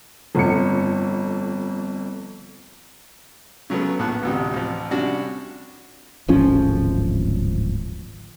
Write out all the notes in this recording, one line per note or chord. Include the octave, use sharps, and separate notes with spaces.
G1 F2 C#7
C#3 F#3 A3 B3
A#1 A2 B3 A5 F#6
A1 D2 C3
A1 F3
C3 G3 C#4 D4 F#4
D1 G#1 F3 C#4